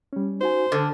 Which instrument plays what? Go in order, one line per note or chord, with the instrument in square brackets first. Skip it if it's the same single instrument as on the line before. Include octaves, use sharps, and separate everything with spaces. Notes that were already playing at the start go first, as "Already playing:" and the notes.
[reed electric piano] G3 C#4
[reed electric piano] D#4 F#4 G#5 [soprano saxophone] C5
[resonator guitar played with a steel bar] D3 [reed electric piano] A4 F6